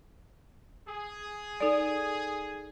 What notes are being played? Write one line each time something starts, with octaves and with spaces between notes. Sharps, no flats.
G#4
D#4 A4 D5